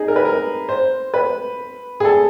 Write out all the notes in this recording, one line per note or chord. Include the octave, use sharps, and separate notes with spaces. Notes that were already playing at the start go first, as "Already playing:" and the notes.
Already playing: D#4 G#4
A#4
B4
A#4
C5
B4
G#4
A4